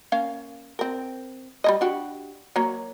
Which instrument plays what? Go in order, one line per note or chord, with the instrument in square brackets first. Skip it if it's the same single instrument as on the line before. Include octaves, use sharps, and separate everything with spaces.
[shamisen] A#3 C#4 F5
C4 A#4
G3 A#3 D#5
D4 F#4 G4
F#3 A#3 C#5